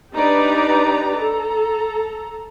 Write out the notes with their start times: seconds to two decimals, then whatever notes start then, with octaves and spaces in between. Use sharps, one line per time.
0.13 D4 D#4 G4 B4 D5 A#5
1.14 A4 A#5